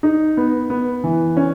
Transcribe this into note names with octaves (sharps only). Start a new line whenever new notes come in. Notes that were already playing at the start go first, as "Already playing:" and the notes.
D#4
B3
B3
E3
C#4